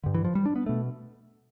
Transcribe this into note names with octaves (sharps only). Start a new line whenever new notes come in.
G2 D3
E3
F3
G3
D4
B3
B2 A3